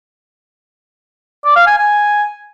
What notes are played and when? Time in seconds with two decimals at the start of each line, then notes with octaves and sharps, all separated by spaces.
1.45 D5
1.56 F5
1.67 G#5
1.78 G#5